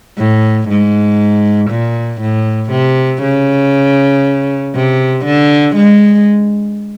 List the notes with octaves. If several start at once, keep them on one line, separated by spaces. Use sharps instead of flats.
A2
G#2
A#2
A2
C3
C#3
C3
D3
G#3